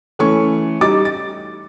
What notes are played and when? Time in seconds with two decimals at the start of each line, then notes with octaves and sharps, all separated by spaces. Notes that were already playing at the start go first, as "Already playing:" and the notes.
0.19 E3 A3 C#4 C#6
0.81 G3 D#4 D6 A6
1.05 A6